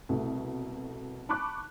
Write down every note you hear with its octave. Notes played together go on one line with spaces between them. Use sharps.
C2 B2 A3
A5 B5 C#6 D6 F#6